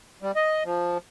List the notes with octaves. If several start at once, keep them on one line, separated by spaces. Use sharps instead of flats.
G3
D#5
F3